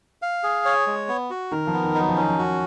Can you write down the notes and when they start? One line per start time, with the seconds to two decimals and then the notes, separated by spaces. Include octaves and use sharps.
0.22 F5
0.43 G#4
0.65 C#5
0.87 G#3
1.08 B3
1.30 F#4
1.51 D#3 A#4
1.67 F3
1.73 B3
1.84 D#3
1.95 D#4
2.01 F#3
2.09 F3
2.16 D#3 C#4
2.28 F3
2.38 F#4